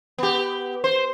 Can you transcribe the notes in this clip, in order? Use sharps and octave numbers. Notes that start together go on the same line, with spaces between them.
B3 G4
C5